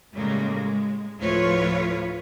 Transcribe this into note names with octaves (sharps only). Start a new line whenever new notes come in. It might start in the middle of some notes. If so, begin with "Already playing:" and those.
A2 C#3 G3 G#3 A#3
G#3
D2 A2 F3 F4 B4 C#5